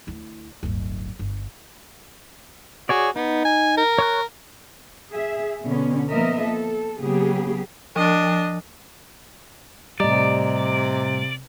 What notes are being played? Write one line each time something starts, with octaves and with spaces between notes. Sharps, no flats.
D2 E4
D1 G1
G1
F#4 G#4 C#5 D5
B3 D#4
G#5
A#4
C#5 C#6 F#6
G#4 E5
B2 D3 B3 C#4
F3 A#3 B3 A#4 D#5 E5
A4
C#3 F#3 A#3 B3 G4 G#4
F3 D4 D#5
A2 C3 G3 D5 D#5 A#5